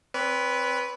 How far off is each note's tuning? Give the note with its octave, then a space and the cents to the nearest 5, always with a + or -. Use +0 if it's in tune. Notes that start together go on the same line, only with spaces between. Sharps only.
C4 +15 B4 +0 D5 -45